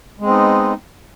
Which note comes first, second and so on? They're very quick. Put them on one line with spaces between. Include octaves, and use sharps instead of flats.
G#3 C4 B3 D#4